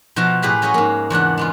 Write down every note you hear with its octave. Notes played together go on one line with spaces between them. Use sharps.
B2 F3 F#4 F5 A5 A#5
A2 G4 G#4 B4 A#5
C#4 F#4 G#4 B4 C#5 D#5
G#2 A#3
E2 C#3 D4 F#5
G#3 B3 F4